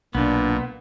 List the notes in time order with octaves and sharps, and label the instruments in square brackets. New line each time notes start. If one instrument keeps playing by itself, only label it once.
[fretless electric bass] B1 [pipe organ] A#2 [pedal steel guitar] B3 [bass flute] D4